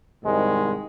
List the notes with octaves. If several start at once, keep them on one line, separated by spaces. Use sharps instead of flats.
C2 G#2 D#3 G#3